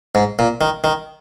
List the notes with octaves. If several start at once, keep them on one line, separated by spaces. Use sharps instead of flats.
G#2
A#2
D#3
D#3